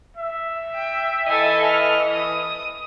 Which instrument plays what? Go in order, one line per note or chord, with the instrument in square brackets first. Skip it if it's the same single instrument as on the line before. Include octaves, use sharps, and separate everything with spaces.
[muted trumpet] E5
[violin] G5
[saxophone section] E3 D#5 [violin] A4 G#5
[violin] F6
D#6